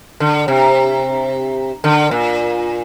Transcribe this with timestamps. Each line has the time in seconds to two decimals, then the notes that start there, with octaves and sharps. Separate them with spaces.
0.20 D3
0.48 C3
1.84 D3
2.11 A#2